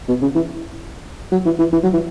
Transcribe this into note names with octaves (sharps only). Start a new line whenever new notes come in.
B2
C#3
E3
F#3
E3
E3
E3
F#3
E3